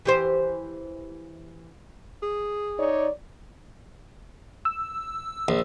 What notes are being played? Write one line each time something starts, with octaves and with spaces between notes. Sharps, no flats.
E3 G4 C5
G#4
D#4 C#5 D5
E6
A#1